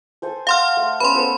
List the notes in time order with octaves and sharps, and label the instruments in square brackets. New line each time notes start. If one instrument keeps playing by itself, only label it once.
[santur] A4 C5 G#5
[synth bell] F5 C6 F6 [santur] F#5
[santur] A3
[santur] B3 C#4 [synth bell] B5 C6
[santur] A4 C5